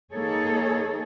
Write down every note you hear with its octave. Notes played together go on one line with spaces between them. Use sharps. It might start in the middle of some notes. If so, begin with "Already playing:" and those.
A#3 D#4 G#4 A4 C#5